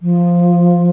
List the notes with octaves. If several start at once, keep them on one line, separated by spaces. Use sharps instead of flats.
F3